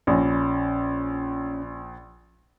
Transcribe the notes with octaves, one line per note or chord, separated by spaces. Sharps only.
A#1 C#4